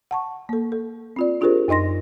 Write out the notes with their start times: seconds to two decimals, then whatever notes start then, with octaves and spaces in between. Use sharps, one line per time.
0.11 F#5 A5 C#6
0.49 A#3 A4
0.72 A4
1.16 C4 F4 D5
1.41 D4 F4 G4 G#4 A#4 C5
1.68 F#2 D#4 D#5 C6 A#6